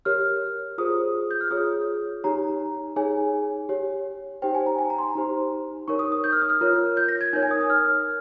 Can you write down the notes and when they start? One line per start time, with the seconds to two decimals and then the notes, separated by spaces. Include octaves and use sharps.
0.05 G4 A#4 C#5 F6
0.78 F4 G#4 C5 D#6
1.31 G6
1.41 F6
1.51 F4 G#4 C#5 D#6
2.24 D#4 G4 C#5 A#5
2.96 D#4 G#4 C#5 G#5
3.69 G4 C#5
4.42 D#4 G4 C5 G5
4.55 G#5
4.66 A#5
4.79 G#5
4.90 A#5
4.98 C6
5.03 A#5
5.15 D#4 G4 C5
5.88 D#4 A#4 C#5 C#6
5.99 D#6
6.12 D#6
6.24 G6
6.32 F6
6.42 D#6
6.50 F6
6.61 F4 A#4 C#5
6.97 G6
7.08 A#6
7.21 G#6
7.33 D#4 A#4 C#5 G6
7.43 G#5
7.51 D#6
7.61 D#6
7.70 F6